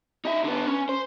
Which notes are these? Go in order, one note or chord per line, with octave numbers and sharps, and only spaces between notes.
D#4 E5
D3 B3
C#4
C5